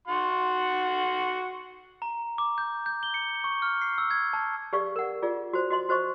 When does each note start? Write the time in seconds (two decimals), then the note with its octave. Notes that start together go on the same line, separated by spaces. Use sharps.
0.08 F#4 F#5 C6
2.02 A#5
2.38 D6
2.58 G6
2.86 G6
3.03 G7
3.14 C#7
3.44 C#6
3.62 F6
3.81 C7
3.98 E6
4.11 G#6
4.33 A5
4.73 G4 G#4 B4 D5 F5 C#6
4.96 A#4 F#5
5.22 F4 G#4 D5
5.53 F#4 C5
5.70 F#4 D#5 C6
5.89 F#4 C5 D#5 C#6